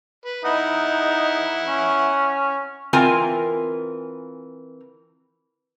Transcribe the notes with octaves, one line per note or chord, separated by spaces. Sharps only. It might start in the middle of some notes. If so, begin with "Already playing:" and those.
B4
D#4 E4 F#5
C#4
E3 C4 F4 A#4 G#5